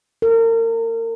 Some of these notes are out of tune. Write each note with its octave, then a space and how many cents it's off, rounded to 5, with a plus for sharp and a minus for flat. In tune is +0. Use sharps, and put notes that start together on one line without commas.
A#4 -35